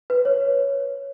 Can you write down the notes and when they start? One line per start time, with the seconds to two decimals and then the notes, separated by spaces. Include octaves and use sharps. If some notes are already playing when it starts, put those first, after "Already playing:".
0.10 B4
0.25 C#5